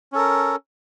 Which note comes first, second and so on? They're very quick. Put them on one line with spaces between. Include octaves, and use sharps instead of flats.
C#4 A4 A#4